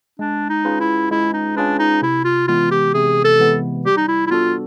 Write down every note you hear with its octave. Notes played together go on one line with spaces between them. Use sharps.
G#3 D4
D#4
C#4 F4 G#4 B4
E4
G#3 E4
D#4
C#4 D4 F4 G#4 B4
D#4
C3 E4
F4
E3 G#3 B3 F4
G4
C3 G#4
A4
E3 G#3 B3
G3 G4
D#4
E4
E4
B3 D4 F4 F#4 A4